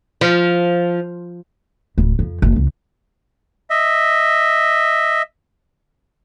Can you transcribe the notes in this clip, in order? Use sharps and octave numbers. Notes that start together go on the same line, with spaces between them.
F3
D1
F2
F#1
C#2
D#5 E5